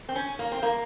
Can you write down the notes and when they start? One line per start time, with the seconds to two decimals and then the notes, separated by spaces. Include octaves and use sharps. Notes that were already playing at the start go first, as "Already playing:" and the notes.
0.09 C4
0.15 C#4
0.39 A#3
0.52 C4
0.63 A#3